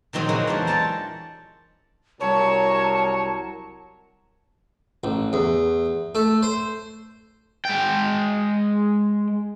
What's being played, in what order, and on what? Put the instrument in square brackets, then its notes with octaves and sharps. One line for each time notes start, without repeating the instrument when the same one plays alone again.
[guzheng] A#2 D#3 F#3 C4 G#4 G5
C#3 F#3 G#3 A#3 E4 F#4
E2 G#3 D4 G4
F4 C#5 D5 A5 A#5
[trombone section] C2 F#3 A#4 [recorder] C#5 [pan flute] A5
[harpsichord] A1
E2
A3
C5
[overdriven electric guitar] G#3 G5